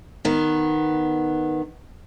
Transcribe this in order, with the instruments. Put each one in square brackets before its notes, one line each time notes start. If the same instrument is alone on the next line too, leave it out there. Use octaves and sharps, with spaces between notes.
[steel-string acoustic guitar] D#3 B3